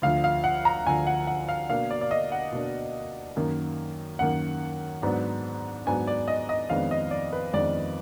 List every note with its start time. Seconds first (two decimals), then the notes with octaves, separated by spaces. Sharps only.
0.02 D2 D3 F3 F5
0.24 F5
0.44 F#5
0.65 A#5
0.86 D2 D3 F3 G#5
1.07 F#5
1.27 F#5
1.48 F5
1.69 B2 A#3 D4 F5
1.90 D5
2.01 D5
2.11 D#5
2.32 F#5
2.52 B2 A#3 D4
3.36 F#2 D#3 A#3
4.19 F#2 D#3 A#3 F#5
5.02 G#2 F#3 B3 D4
5.86 G#2 F#3 B3 D4 G#5
6.07 D5
6.28 D#5
6.49 D#5
6.70 F2 D#3 G#3 B3 D4 F5
6.91 D#5
7.11 D5
7.33 B4
7.53 F2 D#3 G#3 B3 D4 D5